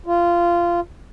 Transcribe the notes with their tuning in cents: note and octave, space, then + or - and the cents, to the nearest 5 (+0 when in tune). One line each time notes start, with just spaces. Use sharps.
F4 -15